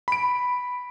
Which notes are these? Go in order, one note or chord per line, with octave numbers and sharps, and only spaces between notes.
B5 D7